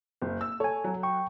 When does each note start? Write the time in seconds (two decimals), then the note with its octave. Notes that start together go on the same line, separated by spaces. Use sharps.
0.22 F#1
0.41 E6
0.60 A4 C#5 G#5
0.84 F#3
1.03 G5 C#6